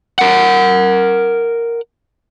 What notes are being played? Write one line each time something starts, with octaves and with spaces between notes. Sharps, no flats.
A#4 F#5